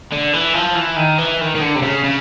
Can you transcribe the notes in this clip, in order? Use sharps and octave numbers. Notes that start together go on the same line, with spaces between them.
D3
E3
F3
E3
D#3
E3
D#3
D#3
D3
C3
C#3
C#3